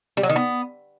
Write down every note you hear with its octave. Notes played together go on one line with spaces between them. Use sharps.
G3
F#3
D#3
B3